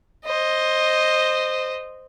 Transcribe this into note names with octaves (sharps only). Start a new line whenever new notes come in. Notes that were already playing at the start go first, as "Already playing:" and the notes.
C5 D#5